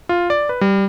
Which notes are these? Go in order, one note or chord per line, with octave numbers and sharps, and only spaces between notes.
F4
D5
B4
G3